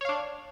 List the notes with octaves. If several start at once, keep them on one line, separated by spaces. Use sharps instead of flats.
D4 C#5 F5